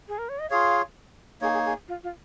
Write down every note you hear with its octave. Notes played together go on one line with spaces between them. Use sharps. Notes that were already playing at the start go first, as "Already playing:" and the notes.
G#4
A#4
C#5
D#5
F4 G#4 C#5 F5
A#3 D#4 G#4 C#5
G#4
G#4
F4
F4